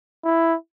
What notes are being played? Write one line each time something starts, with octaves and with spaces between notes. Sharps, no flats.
E4